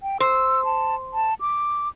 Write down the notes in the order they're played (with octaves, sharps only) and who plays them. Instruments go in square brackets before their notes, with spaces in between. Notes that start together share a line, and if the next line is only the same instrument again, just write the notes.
[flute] G5
[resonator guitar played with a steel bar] C5 [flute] E6
[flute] A5
A5
D6